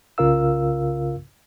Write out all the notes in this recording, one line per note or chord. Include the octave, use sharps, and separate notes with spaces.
C2 C#3 F4 A#4 F5 E6